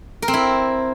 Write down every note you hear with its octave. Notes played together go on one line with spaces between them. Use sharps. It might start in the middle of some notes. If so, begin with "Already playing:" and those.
A#4
C4
E4